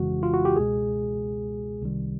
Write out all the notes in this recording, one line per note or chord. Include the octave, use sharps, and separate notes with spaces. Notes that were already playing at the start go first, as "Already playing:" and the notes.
Already playing: G1 F2 C#3 E3 G#3 F#4
F4
F#4
G4
C#2 B2 G#3 G#4
C2 C3 D#3 G3